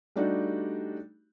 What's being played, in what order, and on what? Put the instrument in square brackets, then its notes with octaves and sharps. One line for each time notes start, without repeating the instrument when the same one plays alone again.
[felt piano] G3 A3 D4 D#4 F#4 G4